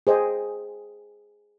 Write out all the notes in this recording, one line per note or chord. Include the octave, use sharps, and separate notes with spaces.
G#4 C5 D#5 G5